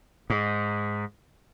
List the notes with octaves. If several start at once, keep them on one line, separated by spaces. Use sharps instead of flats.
G#2